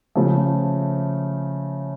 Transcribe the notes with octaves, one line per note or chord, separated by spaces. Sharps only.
C#3 F3 A3